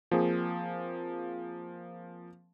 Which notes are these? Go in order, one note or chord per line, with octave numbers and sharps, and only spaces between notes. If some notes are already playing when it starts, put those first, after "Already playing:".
F3 A#3 C4 G#4